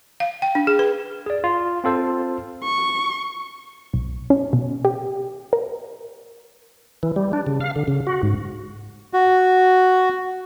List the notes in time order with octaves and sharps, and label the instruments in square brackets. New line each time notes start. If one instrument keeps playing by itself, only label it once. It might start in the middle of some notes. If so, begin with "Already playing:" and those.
[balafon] F5
G5
D4
G#4
B4
[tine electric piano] G#4 D5
F4
C4 F4 A4 C5
[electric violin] C#6
[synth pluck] B1
C#4
B2
G4
A#4
[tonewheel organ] E3
G3
D4
C#3
F5
D3
C#3
F#4
G#2
[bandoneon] F#4